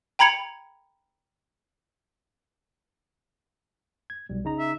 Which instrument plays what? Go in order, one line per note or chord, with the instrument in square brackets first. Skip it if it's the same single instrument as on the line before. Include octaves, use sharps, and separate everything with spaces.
[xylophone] G5 A#5 B5 G#6 C#7 F7
[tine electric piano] G#6
B1 G3
C#3 D#4 A#5
[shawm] E5